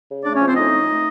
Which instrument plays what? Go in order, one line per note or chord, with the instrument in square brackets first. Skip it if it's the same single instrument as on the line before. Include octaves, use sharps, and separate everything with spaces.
[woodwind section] C#3
A3 D4 D5
C#4 C#5
F3
C4 C5
A2 D#4 D#5
A3
A3